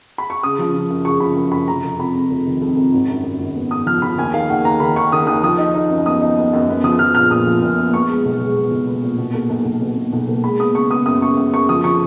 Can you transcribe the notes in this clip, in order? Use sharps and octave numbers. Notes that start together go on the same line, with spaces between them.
B5
C#6
C#3 D#6
F3
F3
F#2
C#3 C#6
F3 B5
F#2
F#2 B5
F1 A#5
F1
F2 B5
F2
F1
D#3
F2
F2
G#1
F#2
F#2
G#1
B3
B3 D#6
F3 F6
F3 B5
D#2 G#5
D#3 F5
D#2 F#5
D#2 A#5
D#3 B5
D#2 C#6
D#2 D#6
D#2 D#6
F3 D#6
D#4
D#4
F#2
B3 D#6
D#4
B3
F#2
B3
F3 D#6
F3 F6
A#1 F6
A#2 D#6
F3
A#2
B3
B3 C#6
G#3
B1
G#3
B3
B1
B3
A#2
B2
A#3
B1
B1
B2
B2
B1
A#3
G#3 B5
B3 D#6
C#3 C#6
B3 D#6
F#2 D#6
C#3 C#6
F#2
F#2 C#6
F3 D#6
F3 C#6